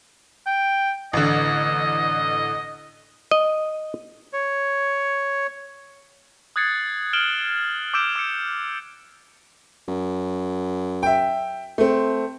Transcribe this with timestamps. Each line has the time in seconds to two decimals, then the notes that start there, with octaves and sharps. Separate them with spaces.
0.47 G5
1.13 A1 D3 D#5
3.31 D#5
4.33 C#5
6.56 D#6 F#6 G#6 A6 C7 C#7
7.13 F6 D7 E7 F#7 G7
7.94 D6 E6 G6 D7 E7
8.16 D6 E6 C#7
9.88 F#2
11.03 E5 G5
11.78 A3 C4